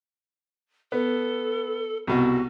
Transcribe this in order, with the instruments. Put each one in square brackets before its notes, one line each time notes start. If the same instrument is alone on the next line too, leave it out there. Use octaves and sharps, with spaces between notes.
[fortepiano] B3 [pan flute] A4
[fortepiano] C2 B2 [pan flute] F#4